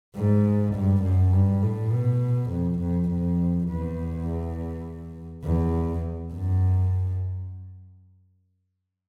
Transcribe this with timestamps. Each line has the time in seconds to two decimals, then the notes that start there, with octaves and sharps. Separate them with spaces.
0.15 G#2
0.75 G2
1.03 F#2
1.33 G2
1.63 A2
1.92 B2
2.51 F2
2.80 F2
3.10 F2
3.68 E2
5.44 E2
6.33 F#2